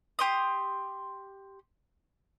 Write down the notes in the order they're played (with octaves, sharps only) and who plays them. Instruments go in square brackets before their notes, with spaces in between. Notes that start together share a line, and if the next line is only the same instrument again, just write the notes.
[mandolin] G4 C6 D#6